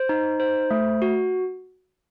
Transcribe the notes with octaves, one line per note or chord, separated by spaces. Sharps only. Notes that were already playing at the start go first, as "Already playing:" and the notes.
Already playing: C5
D#4
C5
A3
F#4